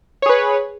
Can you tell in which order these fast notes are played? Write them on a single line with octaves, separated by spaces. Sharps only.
C#5 G#4 B4